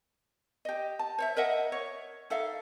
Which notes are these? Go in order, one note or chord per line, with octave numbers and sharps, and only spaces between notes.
G4 D#5
A5
C5 C#5 E5
A#4 D#5 E5 F#5
C#5
D#4 A4 E5 F5